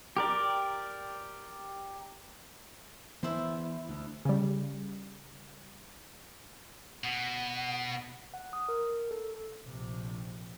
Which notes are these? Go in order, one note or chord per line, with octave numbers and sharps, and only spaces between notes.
G4 A#4 D5
E3 B3 E4 C5
D2
C#3 G3
B2 F#5
F#5
D#6
A#4
A4
A#1 C3